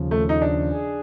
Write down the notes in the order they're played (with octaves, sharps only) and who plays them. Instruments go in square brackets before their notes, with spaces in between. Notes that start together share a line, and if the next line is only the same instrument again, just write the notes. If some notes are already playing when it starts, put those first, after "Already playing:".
Already playing: [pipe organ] D#2 C#3 F3
[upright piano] A3
D#4
D4
[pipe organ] G#4